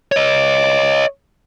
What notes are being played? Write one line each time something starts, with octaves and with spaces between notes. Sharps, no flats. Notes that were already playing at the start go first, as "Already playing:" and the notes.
C#5 D#5